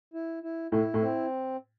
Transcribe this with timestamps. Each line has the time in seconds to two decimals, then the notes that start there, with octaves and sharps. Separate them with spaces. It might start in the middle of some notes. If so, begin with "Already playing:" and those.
0.14 E4
0.43 E4
0.71 A2 E4
0.94 A2
1.01 C4